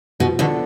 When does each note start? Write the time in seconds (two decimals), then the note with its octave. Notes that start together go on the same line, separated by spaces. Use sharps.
0.20 B2 F3
0.39 B2 D3 B3 D4 A4